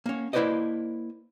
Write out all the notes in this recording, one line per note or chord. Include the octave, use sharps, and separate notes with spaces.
A#3 C#4
A#3 E4 B4 C5 D5 D#5